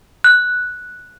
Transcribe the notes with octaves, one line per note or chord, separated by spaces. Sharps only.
F#6